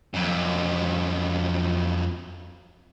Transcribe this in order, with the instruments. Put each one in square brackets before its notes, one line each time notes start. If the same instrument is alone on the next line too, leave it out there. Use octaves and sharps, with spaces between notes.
[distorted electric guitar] F2 F#3